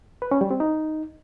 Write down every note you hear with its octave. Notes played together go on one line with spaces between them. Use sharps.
B4
C#4
G3
C4
D#4